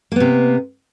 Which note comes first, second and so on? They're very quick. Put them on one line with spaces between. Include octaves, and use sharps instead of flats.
A#3 B3 C3